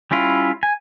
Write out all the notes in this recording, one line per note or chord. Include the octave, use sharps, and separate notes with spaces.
G3 C#4 E4 F4
G#5